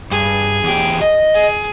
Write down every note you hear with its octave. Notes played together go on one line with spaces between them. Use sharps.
G2 G#4
E2 G4
D#5
G#4